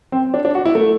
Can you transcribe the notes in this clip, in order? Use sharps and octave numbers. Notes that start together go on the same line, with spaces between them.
C4
D4
D4
F#4
E4
A3